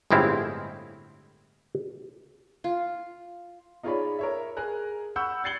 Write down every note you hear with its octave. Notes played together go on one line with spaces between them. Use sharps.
G1 A2 G#3 C4 E4 F5
F4
D#4 F4 G#4 C#5 D5 B5
A#4 C#5 E5
G#4 A#4 G#5 A#5 F#6
F#5 B5 C#6 E6 G6
G#6 A6 C7 C#7 F#7 G7